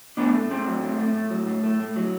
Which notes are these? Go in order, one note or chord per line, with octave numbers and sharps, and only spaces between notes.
A2 B3 D4
A3
A2 C4
F#3
A2
A3
A2
F#3
A2
A3
A2
F#3